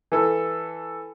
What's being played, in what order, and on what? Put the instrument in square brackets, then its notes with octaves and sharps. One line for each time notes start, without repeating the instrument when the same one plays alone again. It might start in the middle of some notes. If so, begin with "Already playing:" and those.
[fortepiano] E3 A4